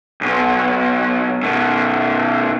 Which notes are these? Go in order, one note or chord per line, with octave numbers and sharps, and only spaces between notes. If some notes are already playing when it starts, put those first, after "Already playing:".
B1 B2
B2 D#3